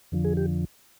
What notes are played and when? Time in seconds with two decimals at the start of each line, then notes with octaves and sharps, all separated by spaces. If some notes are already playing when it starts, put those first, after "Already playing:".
0.12 F2 D3 F3
0.25 G#4
0.37 G4